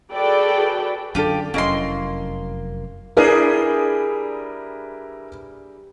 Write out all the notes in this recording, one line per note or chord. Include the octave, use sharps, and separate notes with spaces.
F#4 G#4 A4 B4 D5 G5
F#2 D3 D4 F4 G4 A4
F1 F#2 A#3 C#4 E4 D#5 C6
G3 D4 E4 G#4 A#4 B4